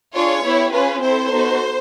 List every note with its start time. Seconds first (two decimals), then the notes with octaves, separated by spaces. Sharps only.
0.15 D4 F4 G#4 C#5
0.44 B3 E4 G4
0.73 C#4 F4 G#4 B4
1.02 C4 E4 A4 C5
1.31 B3 D#4 F#4 A4